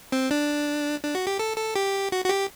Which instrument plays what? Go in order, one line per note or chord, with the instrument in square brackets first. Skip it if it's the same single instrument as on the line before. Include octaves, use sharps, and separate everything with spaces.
[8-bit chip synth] C4
D4
D4
F#4
G4
A4
A4
G4
F#4
F#4
G4